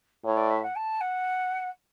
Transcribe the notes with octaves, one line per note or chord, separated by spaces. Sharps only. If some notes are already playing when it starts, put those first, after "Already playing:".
A2 C#5
D5
E5
F#5
A5
F#5